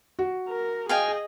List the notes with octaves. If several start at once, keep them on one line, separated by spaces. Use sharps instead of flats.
F#4
A#4
G#4 D#5 F5 G5 G#5